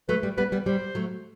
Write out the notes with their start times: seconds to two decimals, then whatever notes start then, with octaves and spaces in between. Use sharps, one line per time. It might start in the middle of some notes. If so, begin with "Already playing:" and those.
0.09 F#3 A3 B4
0.23 G3
0.37 G3 B3 B4
0.52 G3 B3
0.66 G3 C5
0.95 F#3 A3